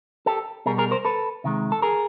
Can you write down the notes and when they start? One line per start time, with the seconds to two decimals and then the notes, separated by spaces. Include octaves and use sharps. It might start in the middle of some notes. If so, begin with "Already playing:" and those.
0.26 G4 A4
0.66 B2 G3 G#4 A#4
0.78 G#4 A#4
0.91 A#4 C5
1.05 A4 B4
1.44 C3 D#3 G#3
1.72 A4
1.82 G#4 A#4